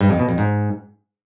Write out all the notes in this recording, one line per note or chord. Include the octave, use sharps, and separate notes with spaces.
G2
F2
B2
F2
G#2